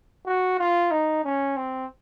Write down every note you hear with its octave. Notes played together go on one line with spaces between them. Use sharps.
F#4
F4
D#4
C#4
C4